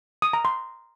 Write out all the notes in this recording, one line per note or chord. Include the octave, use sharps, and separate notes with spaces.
D#6
A#5
C6